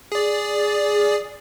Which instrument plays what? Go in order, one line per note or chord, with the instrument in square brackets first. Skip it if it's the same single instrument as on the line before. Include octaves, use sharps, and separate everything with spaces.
[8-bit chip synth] G#4 D5